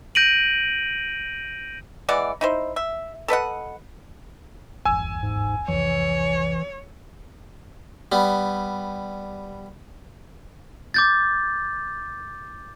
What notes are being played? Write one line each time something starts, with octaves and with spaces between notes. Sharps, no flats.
G6 A#6 D7 D#7 F#7
E3 G#3 D5 F#5
D#4 E4 C5
E5
A4 B4 D#5 F#5
D1 G1 E2 G#5 E6
G#2
C2 F2 E3 C#5
G3 B3
D6 G6 A6